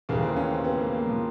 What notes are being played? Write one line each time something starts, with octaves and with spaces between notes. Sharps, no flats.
D#2 C#3 E3 A#3
C4
C#4
C4
B3
A#3
A#3
F3